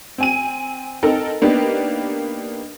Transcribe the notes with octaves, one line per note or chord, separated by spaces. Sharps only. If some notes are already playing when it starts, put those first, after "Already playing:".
C4 G#5 D#7
C4 D#4 A4 A#4
A#3 B3 D4 D#4 G4